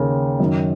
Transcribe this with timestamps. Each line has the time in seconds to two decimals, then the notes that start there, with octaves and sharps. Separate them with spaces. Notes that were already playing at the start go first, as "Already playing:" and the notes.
Already playing: D#2 C#3 A#4
0.40 F#2 D#3